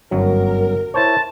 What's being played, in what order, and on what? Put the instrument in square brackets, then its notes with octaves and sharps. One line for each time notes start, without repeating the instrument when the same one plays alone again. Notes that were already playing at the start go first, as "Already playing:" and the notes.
[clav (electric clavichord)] G1 F#2 F#3 [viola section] A#4
[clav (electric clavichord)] E4 C5 C#5 [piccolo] A5